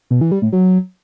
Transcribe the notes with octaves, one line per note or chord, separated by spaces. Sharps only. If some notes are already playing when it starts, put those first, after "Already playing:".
B2
E3
G3
A2
F#3